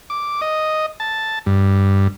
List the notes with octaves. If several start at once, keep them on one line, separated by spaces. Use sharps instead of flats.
D6
D#5
A5
G2